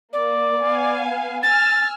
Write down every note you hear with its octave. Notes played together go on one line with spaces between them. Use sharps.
A#3 D5
B3 F5 G#5
G#5 E6 F6 A6